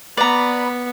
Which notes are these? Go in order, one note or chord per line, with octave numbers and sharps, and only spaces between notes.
B3 B4 D5 A#5 B5